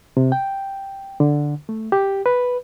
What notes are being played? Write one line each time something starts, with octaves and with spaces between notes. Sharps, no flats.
C3
G5
D3
A3
G4
B4